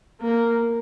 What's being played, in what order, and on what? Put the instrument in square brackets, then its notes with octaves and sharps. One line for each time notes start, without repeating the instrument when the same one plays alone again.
[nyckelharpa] A#3